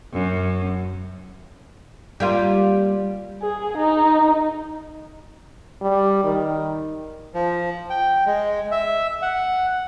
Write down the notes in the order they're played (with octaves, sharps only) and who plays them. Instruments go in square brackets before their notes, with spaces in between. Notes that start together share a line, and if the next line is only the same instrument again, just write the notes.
[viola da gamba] F#2
[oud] G3 A#3 F4
[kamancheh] G#4
D#4
[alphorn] G3
D#3
[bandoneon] F3
G5
G#3
E5
F#5